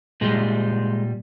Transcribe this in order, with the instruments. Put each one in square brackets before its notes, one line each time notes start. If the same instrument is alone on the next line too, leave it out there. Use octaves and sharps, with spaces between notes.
[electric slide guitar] A#2 G3 G#3